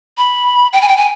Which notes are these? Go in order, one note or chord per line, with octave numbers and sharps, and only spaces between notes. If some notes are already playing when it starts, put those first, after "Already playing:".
B5
G5
G#5
G5
G#5